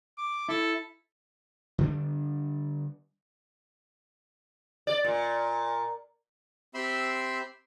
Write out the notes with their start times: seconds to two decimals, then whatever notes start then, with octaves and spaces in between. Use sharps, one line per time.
0.18 D6
0.49 E4 A4
1.78 D3 G3 D4
4.87 D5
5.04 A#2
6.74 C4 G4 E5 B5 C6 E6